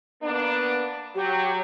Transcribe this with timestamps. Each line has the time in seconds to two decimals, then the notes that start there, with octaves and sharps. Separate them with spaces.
0.22 A#3 B3 D4
1.15 F#3 G4